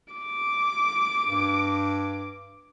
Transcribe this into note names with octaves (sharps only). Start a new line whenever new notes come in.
D6
G2